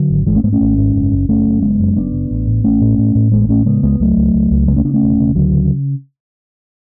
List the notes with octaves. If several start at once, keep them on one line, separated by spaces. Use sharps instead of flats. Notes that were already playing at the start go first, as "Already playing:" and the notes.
Already playing: D3 F#3
G#1
G#1 E3 G#3
A3 C#4
G#2 G#3 B3
A3 C#4
G#1
G#2
F#1
F#1
F#1 A3 C#4
F#2
F#1 G#3 B3
F#2
F#1 B3 D4
C#3
A1
A2
A1 A3 C#4
A2
A2
A2
A1 G#3 B3
A2 A3 C#4
C#3 G#3 B3
C#2 G#3 B3
C#2 F#3 A3
C#2
C#2
C#2
C#3 G#3 B3
A3 C#4
C#3 B3 D4
A3 C#4
E1
C#3
D2 D3 F#3
C#3